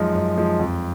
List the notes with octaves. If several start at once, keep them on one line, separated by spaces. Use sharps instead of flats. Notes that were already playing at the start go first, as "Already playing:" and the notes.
Already playing: F#2 F3 G#3 D#4
F#2
F3 G#3 D#4
F2